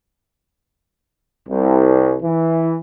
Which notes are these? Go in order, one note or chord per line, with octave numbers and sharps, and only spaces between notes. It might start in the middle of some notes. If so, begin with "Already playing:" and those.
C2
E3